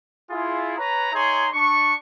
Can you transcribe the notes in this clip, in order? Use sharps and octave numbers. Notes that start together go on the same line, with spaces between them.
E4 F4 G#4
B4 C#5 A#5
D#4 G#4 C#5 E5 A#5 C6
D4 C#6